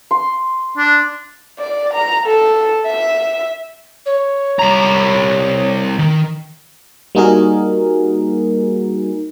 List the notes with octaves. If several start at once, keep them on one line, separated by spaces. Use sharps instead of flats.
C6
D4
D5
A#5
A4
E5
C#5
C2 A#5
D#3
G3 A#3 D#4 F#4 G#4 A#4